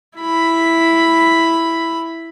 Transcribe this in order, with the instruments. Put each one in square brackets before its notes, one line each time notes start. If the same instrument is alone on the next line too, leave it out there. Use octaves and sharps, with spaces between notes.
[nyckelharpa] E4 B5